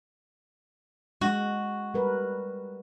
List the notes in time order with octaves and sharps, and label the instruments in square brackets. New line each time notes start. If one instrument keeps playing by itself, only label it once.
[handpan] G#3 [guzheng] F#4
[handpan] G3 A#4 B4